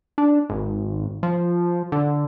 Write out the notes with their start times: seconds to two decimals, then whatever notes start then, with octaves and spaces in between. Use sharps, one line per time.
0.18 D4
0.49 G#1
1.23 F3
1.92 D3